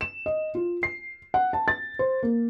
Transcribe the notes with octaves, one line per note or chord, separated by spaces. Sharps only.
E7
D#5
F4
C7
F#5
A5
A6
C5
A#3